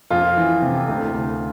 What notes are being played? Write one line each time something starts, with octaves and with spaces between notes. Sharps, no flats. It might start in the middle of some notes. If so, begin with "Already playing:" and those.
F2 F4
E3
C3
D2
D2